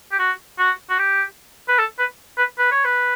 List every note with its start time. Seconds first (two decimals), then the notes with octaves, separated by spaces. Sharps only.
0.12 G4
0.19 F#4
0.59 F#4
0.90 F#4
0.99 G4
1.69 B4
1.79 A4
1.99 B4
2.38 B4
2.59 B4
2.72 C#5
2.85 B4